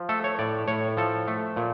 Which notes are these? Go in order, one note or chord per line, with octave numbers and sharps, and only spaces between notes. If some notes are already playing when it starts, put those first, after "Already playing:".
Already playing: F3
A3 A4
C#5
A2 D5
A2 C#5
F3 A4
A3
A#2